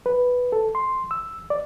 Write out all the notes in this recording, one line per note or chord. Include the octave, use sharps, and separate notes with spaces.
B4
A4
C6
E6
D5